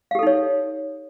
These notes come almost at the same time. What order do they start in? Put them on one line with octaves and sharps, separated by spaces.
F5 G4 A4 D#4 C#5